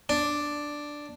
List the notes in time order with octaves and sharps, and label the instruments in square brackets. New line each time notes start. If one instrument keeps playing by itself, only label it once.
[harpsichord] D4